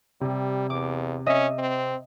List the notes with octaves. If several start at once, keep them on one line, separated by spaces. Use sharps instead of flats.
C3 G3
E2 D6
C#4 D#5 E5
C4